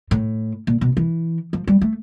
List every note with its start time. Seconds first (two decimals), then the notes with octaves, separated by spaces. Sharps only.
0.11 A2
0.67 A#2
0.81 B2
0.97 E3
1.53 F3
1.67 G3
1.81 A3